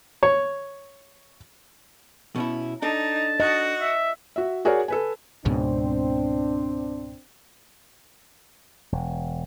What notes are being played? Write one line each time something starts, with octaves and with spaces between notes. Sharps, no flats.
C#5
B2 C#4 E4
D4 D#4 A4 A5
F#4 D#5
E5
F#4 E5
F#4 G#4 A#4 C#5 D5
A4 B4 G#5
C#2 G#2 B2 C4 D4
E1